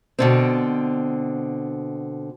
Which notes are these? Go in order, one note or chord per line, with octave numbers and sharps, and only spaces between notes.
B2 D3 C4